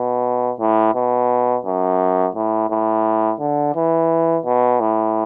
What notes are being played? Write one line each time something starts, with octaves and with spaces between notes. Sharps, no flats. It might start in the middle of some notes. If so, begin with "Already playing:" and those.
Already playing: B2
A2
B2
F#2
A2
A2
D3
E3
B2
A2